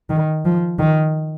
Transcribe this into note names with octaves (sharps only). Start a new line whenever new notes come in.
D#3
F3
D#3